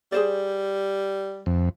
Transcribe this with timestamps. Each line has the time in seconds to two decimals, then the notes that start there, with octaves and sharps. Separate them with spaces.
0.12 G3 G#4 C5 D5
1.46 F2